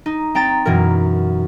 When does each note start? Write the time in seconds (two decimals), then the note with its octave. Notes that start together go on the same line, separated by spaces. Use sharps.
0.06 D#4
0.35 C4 G5 A#5 A6
0.66 F#2 B2 E3 A#4